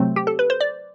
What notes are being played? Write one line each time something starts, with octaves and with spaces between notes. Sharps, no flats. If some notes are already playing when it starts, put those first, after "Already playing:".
Already playing: C3 F#3 A3 C4 C5
G4
A4
B4
C5
D5